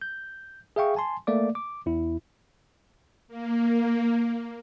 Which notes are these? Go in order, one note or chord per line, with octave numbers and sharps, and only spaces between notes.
G6
G#4 E5 F5 G5 C#6
G#5 A5 C6
A3 A#3 D5 D6
D6
E2 E4
A#3